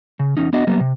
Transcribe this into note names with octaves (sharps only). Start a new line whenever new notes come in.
C#3
E2 C#4 D#4
B3 D4 F#4 D#5
F#3 G3 A#3 B3
C3